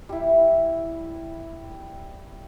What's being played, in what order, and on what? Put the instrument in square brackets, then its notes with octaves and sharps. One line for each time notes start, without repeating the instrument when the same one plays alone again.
[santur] G3 E4